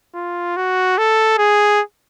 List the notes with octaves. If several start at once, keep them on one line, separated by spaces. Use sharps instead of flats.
F4
F#4
A4
G#4